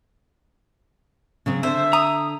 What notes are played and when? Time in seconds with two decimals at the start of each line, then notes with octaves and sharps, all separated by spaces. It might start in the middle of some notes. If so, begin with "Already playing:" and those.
1.46 C#3 F#3 C4
1.63 D3 C5 E5
1.93 A#5 D#6